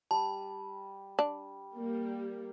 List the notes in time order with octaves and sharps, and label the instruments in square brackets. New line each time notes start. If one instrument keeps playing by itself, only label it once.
[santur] G3 [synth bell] A5
[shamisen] D4
[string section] G3 A#3